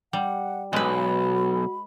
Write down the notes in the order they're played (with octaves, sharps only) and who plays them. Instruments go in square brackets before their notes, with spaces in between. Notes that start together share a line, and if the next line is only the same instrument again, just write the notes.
[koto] G3 [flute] F#5
[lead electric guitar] B1 [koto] G#3 B4 [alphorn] F#4 [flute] B5